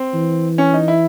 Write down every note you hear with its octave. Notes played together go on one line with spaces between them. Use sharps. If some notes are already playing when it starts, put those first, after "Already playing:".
Already playing: C4
E3
C#4
D#4
E4